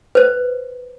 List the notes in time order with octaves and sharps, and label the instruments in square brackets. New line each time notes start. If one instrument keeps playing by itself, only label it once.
[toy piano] B4 C5